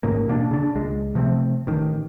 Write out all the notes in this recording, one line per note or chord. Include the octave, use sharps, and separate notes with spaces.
A1 G#2 C#3 A#3
B2 A#3 C#4 D4
C#3 D4
C#2 G#3
C3 F3 A3 C4
A1 D#3